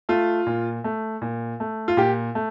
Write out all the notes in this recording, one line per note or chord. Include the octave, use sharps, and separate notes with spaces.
A3 F4
A#2
A3
A#2
A3
F4
A#2 G4
A3